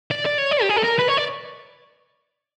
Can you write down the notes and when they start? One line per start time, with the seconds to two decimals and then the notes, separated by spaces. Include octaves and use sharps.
0.11 D5
0.25 D5
0.38 C#5
0.51 D5
0.62 G4
0.69 G#4
0.77 A4
0.84 A#4
0.99 B4
1.09 C#5
1.18 D5